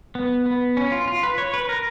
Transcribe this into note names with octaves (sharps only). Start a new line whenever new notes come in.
B3
B3
C#4
F4
F4
B4
C#5
B4
A#4